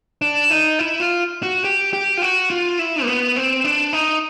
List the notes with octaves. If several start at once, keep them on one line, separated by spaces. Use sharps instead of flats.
D4
D#4
E4
F4
F#4
G4
G4
F4
F#4
F4
E4
A#3
B3
C4
D4
D#4